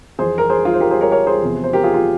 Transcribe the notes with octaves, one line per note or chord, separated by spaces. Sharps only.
F2 E3 G#4 C5
A#4
G#4 C5
F4 G#4
C5
G4 A#4
G#4 C5
A#4 C#5
A#4 C#5
G#4 C5
E2 C3 F3
C5
G4 A#4
F4 G#4
F4